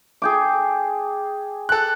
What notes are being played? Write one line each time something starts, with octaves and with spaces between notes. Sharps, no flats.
G#4 G5 D6
A4 F#6